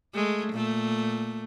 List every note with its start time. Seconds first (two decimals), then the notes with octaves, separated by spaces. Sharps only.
0.14 G#3 A3
0.52 A#2 A3